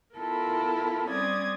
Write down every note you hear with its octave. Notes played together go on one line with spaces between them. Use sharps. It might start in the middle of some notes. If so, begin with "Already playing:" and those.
B3 E4 F4 A4 A#4
G3 C4 C#4 D5 D#6 G#6